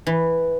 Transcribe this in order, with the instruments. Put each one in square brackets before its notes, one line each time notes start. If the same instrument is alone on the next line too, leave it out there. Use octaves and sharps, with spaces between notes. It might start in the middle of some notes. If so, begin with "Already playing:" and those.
[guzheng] E3